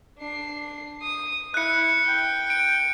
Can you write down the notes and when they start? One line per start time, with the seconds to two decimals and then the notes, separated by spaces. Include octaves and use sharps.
0.18 D4 C7
1.03 D#6
1.54 E4 F#6 C#7
2.05 G5
2.50 D7